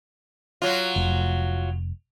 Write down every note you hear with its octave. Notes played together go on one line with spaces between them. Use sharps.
F#3 F4
F1